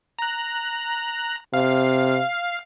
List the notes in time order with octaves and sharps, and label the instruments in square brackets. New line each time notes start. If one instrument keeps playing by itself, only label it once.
[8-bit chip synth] A#5 F#6
[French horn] C3 [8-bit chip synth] F5